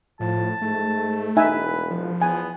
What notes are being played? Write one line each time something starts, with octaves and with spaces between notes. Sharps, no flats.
A2 F3 A5
G#2 A3
E1 D#4 B4 E5 G#5
F3
E2 B3 G#5